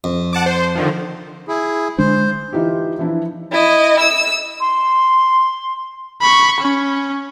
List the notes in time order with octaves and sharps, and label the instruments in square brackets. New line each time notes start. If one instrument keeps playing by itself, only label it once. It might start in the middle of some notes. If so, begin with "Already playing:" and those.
[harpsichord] F2
[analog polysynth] F#5 A5 D6
C5
D3 D#3 F3
[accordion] E4 G#4
[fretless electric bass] D3 G#3 D4 [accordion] C5
[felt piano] E3 D#4 F4 G4
E3 F3 D4 E4
[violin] E4 D#5
E6
[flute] C6
[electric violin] B5 C#6
C#4